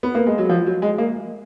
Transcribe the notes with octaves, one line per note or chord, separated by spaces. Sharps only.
B3
A#3
G#3
F#3
F3
F#3
G#3
A#3